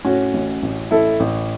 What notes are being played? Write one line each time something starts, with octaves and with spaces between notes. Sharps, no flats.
A2 C#4 F#4
A1
A1
A1 E4 A4
A1